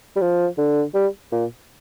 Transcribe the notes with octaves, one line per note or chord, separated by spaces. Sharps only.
G3
F3
D3
G3
A#2